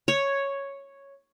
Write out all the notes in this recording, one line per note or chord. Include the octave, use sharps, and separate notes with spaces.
C#5